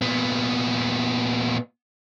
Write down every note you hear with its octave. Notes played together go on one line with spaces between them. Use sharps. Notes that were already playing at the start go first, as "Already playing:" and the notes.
A#2 B3